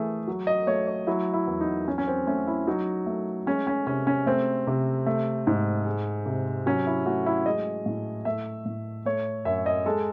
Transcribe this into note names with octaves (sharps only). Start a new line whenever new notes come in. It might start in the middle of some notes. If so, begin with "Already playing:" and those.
Already playing: E3 A3 G#4
F#3
D#5
A3 C#5
C#5
F#3 E4
E4
E2
D#4
F#3 C#4
C#4
C4
A3 C#4
E4
F#3 D#4
A3
G#3 C#4
C#4
C3 C#4
C#4
A3 C4
C3
A3
G#2
G#3
C3
F#3 C#4
E4
A3 F#4
E4
G#3 D#5
A2
A3 E5
A2
A3 C#5
F#2 E5
D#5
G#3 A4